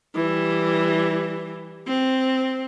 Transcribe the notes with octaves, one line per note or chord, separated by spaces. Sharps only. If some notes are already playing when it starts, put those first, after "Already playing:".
E3 G3
C4